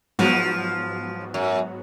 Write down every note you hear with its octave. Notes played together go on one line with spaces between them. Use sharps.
G#2 F3 F#3 B3 F#4
F#2